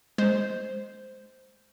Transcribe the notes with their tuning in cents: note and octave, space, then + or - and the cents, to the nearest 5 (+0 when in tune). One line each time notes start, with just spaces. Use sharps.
G#3 +0 C5 +0